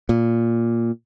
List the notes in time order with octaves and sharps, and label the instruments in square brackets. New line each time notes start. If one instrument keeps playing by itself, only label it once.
[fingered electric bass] A#2